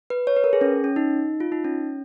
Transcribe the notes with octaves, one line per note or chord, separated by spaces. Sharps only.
B4
C#5
B4
A#4
G#4
C#4
C#4
D#4
F4
D#4
C#4